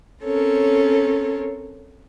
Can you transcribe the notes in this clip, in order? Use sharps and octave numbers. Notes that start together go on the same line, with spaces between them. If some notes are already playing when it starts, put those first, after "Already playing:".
C4 C#4 A4 A#4 C#5